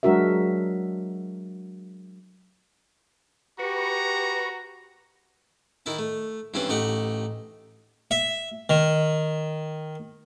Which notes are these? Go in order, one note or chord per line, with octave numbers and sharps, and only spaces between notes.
F#3 G#3 D4 F#4 A#4 E5
F#4 G4 B4 A#5 C#6
D#3 E4 E5 A5
A3
G2 E3 C4 C#4 B4 A5
A1 A3 D#4 G4 F#5
E5
D#3